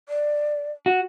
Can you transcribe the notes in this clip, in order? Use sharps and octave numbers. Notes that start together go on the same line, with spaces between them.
D5
F#4